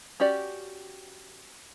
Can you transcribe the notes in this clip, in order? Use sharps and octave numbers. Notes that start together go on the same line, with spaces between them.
C#4 F#4 G4 D5